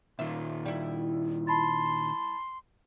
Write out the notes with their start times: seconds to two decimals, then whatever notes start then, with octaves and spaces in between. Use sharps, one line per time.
0.19 A#2 D#3 F4 E5
0.66 G3 E4
1.47 A5 B5 C6 A6